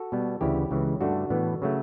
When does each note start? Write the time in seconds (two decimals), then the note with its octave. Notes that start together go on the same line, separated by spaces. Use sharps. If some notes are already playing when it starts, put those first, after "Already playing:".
Already playing: F#4 A4
0.12 B2 G3 B3
0.41 D2 C#3 E3 E4 G4
0.71 C#2 C#3 E3
1.01 G2 D3 A3 D4 F#4
1.30 A2 E3 B3
1.62 C#3 F#3 A3